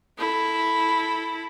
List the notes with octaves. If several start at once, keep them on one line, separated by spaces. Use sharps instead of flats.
E4 A4